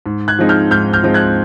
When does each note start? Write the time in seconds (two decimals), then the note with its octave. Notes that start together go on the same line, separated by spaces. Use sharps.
0.06 G#2
0.28 F#6 G#6
0.39 F3 G#3 C4 D#4
0.49 F6 G6
0.71 G#2 F6 G6
0.93 F6 G6
1.03 F3 G#3 C4 D#4
1.14 F#6 G#6